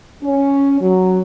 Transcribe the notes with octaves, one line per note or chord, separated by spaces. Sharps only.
C#4
F#3